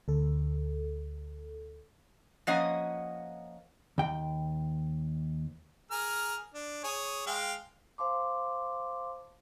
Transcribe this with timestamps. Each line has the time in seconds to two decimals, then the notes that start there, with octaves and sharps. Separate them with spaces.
0.08 D2 A4
2.47 F3 A#3 C#4 D#5 F#5
3.98 D#2 G5
5.91 G#4 A#4 F6
6.54 D4
6.84 G#4 C#5 D#6
7.26 G#3 F5 G5
7.98 C5 F5 A5 C6 D6